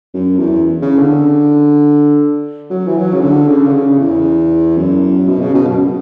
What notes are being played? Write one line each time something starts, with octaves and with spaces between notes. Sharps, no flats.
F#2
E2
C#3
D3
F#3
E3
F#3
C#3
D3
C#3
D3
C#3
E2
F#2
B2
C#3
B2
F#2